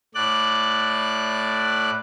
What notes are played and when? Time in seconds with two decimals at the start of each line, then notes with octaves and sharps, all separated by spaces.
0.15 A2 D5 F#6